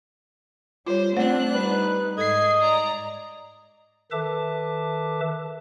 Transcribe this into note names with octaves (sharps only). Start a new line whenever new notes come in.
G3 F4 C5 C#5
A3 C4 D4 C5 F#5 F#6
G3 D#4 B4
G#2 A4 D#5 G#6 C7
D5 A#5
D#3 A4 B4 E5 A5 D6